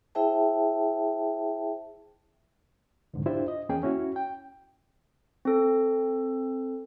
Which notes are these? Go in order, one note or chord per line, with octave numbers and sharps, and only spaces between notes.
E4 G#4 C5 E5 G5 A5
C2 F2 G#2 D3
D4 E4 F4 G4 C5
D#5
E2 A#3 C#4 G#4 G5
C#4 E4 F#4
G5
C4 A4